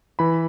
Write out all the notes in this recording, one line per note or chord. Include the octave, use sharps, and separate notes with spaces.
E3 B5